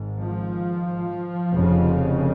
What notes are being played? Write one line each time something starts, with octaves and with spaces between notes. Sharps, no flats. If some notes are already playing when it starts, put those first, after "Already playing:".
Already playing: G#1 G#2
F3
F1 F2 C#3